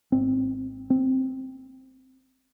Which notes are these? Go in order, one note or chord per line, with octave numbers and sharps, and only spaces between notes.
G#1 G#2 C4
C4